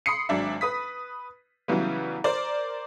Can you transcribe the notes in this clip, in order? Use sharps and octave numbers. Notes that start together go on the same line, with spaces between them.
B5 C6 D#6 C7 C#7
G#1 F#3 D4 E5
B4 D#6 B6
C#3 E3 F#3 G3 B3
A#4 C5 D5